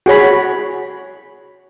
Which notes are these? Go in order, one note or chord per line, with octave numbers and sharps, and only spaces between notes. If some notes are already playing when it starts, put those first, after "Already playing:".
F#4 G#4 C#5 B5